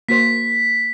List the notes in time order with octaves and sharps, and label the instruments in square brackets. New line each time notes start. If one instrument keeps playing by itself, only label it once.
[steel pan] A#3 F#4 C5 [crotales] B6